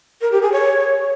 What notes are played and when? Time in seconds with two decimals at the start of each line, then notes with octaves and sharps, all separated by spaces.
0.22 A#4
0.32 G4
0.42 G#4
0.52 C#5